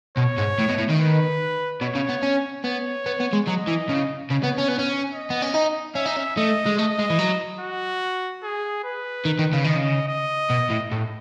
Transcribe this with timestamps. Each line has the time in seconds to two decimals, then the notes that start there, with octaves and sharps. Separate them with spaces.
0.17 B2 C#5
0.38 G#2
0.59 A2
0.69 B2
0.78 A2
0.89 D#3
0.99 B4
1.82 B2 C#5
1.95 C#3
2.09 B3
2.23 C#4
2.64 B3 C#5
3.06 B3
3.20 B3
3.33 G#3
3.47 F#3 D#5
3.68 E3
3.89 C#3
4.30 C#3 C#5
4.43 B3
4.58 C#4
4.68 B3
4.79 C#4
5.12 D#5
5.30 B3
5.42 C#4
5.54 D#4
5.95 C#4 E5
6.06 D#4
6.16 C#4
6.36 A3 D#5
6.66 G#3
6.78 A3 D#5
6.99 G#3
7.10 E3
7.19 F#3
7.60 F#4
8.43 G#4
8.84 B4
9.25 D#3
9.39 D#3
9.53 C#3
9.64 D#3 D#5
9.76 C#3
10.08 D#5
10.50 B2
10.70 A2
10.91 A2